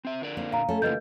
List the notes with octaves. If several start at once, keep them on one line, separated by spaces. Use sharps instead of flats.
C4 E5
D3 A#4 D5
A#3 C4 D#4
A#2 F5 A#5
A3 C#4 A4
C#3 E3 F3 A#3 G4 B4 D#5 G6